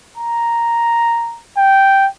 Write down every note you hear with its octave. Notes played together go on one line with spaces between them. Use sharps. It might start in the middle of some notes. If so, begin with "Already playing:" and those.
A#5
G5